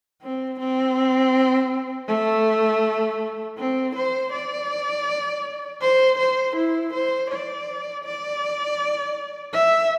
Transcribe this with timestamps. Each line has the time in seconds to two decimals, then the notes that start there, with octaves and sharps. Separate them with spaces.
0.22 C4
0.59 C4
2.08 A3
3.57 C4
3.95 C5
4.32 D5
5.81 C5
6.18 C5
6.55 E4
6.93 C5
7.30 D5
8.04 D5
9.53 E5